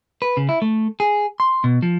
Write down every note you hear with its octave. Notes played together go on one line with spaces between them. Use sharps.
B4
C#3
E4
A3
G#4
C6
B2
F3